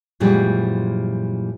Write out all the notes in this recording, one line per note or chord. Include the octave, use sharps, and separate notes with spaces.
F#2 A#2 E3 F3 G3 G#3